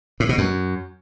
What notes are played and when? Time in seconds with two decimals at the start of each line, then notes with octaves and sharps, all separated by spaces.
0.20 A2
0.29 B2
0.38 F#2